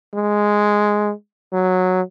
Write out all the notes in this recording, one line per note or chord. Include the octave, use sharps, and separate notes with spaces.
G#3
F#3